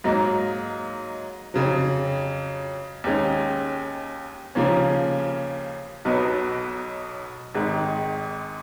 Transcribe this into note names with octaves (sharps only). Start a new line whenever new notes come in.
G#2 F#3 A#3 D#4
F2 C#3 F#3
D#2 D#3 G#3 C#4
D#2 C#3 F3 A#3 C#4
B1 B2 F#3 B3 D#4
G#1 G#2 D#3 G#3